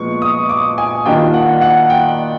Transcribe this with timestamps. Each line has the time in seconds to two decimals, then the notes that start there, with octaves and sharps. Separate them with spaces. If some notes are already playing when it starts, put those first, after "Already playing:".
Already playing: A#2 F3 G#3 B3 C#6
0.22 D#6
0.49 D6
0.78 G#5
1.05 D#3 G3 A#3 D4 F4 G5
1.34 F#5
1.61 F#5
1.90 G5